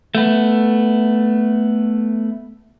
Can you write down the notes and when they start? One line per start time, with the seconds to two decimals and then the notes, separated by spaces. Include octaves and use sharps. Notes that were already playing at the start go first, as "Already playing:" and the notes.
0.15 A3 B3